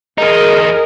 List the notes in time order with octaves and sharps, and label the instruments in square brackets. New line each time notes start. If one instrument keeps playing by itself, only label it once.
[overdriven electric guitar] E2 D#4 [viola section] G#4 A#4 D#5